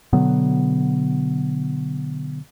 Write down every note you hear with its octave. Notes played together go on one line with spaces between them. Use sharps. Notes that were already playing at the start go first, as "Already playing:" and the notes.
B2 D3 F#3 B3